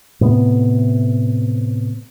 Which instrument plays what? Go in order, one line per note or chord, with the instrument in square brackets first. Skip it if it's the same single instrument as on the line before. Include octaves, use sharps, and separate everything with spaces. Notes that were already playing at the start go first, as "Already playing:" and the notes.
[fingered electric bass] A2 C3 B3